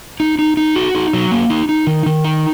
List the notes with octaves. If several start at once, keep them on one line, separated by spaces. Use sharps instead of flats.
D#4
D#4
D#4
F#4
D#4
F#3
A#3
D#4
D#4
D#3
D#3
D#4